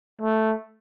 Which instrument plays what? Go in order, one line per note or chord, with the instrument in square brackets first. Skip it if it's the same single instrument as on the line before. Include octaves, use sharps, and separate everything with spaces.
[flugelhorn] A3